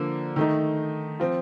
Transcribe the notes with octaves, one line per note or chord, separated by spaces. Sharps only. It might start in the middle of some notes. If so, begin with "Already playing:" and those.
Already playing: D3 F3 A#3
D#3 A3 D#4
F3 C4 F4